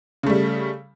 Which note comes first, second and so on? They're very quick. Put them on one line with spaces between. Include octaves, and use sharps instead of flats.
C#3 A3 G3